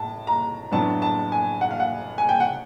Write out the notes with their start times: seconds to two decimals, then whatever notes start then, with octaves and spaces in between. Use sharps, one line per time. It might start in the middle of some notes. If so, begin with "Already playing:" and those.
Already playing: A2 A5
0.27 A#5
0.72 A2 F#3 B3 D4 A5
1.02 A5
1.32 G#5
1.61 F#5
1.71 F5
1.80 F#5
2.18 G#5
2.29 G5
2.40 F#5